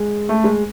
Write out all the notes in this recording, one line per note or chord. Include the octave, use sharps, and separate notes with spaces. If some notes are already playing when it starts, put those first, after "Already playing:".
Already playing: G#3
A3
G#3